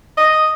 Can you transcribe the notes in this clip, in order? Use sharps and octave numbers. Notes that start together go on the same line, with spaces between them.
D#5